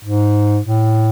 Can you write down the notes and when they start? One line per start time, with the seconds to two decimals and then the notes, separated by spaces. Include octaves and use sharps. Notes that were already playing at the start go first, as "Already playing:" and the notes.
0.04 G#2
0.65 A2